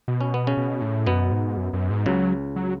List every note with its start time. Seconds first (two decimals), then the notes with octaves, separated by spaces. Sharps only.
0.08 B2
0.21 C#4
0.34 B3
0.47 C#3 C#4
0.57 B2
0.81 A2
1.06 F#2 B2 B3
1.31 G#2
1.57 F#2
1.73 F#2
1.90 G#2
2.06 C#2 C#3 F#3
2.56 F#3